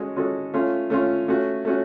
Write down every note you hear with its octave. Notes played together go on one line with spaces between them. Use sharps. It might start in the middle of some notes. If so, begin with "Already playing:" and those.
Already playing: G#3 C#4 F#4 A4
G#3 C#4 F#4 A4
A3 C#4 F4
A3 C#4 F4
A3 C#4 F#4
A3 C#4 F#4